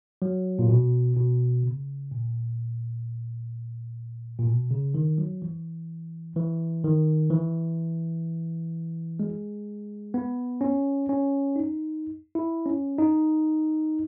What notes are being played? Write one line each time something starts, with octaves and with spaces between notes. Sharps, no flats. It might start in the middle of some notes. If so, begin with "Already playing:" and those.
F#3
A#2
B2
B2
C#3
A#2
A#2
B2
C#3
D#3
F#3
E3
E3
D#3
E3
G#3
B3
C#4
C#4
D#4
E4
C#4
D#4